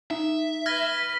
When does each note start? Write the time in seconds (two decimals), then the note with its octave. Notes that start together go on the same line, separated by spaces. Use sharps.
0.11 D#4 E5
0.66 B4 F6 G#6 A#6